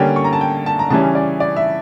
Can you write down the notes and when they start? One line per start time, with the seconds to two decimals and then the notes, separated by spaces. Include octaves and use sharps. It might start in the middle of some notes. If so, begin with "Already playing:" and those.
Already playing: D3 G3 A#3 C#4 G5
0.16 C#6
0.24 A#5
0.33 A5
0.41 G5
0.66 A5
0.79 A#5
0.90 C#3 E3 G3 C#4 A5
1.15 D5
1.40 D5
1.56 E5